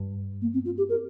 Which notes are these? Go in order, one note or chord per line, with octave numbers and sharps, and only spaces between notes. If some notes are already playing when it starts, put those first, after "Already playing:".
Already playing: G2
A#3
C4
F4
G4
A#4